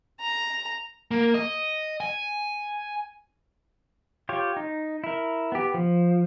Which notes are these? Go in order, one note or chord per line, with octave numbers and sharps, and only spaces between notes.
A#5
A#3
D#5
G#5
F4 G4 C#5
D#4
E4 A#4
B3 G4
F3